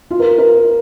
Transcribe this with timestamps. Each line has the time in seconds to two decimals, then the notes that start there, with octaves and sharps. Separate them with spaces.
0.11 F4
0.20 A#4
0.38 A#4